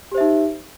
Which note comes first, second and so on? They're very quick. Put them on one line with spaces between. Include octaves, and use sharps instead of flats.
G4 C5 E5 D#4